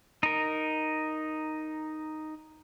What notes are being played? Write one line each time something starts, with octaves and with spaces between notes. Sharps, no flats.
D#4 A#4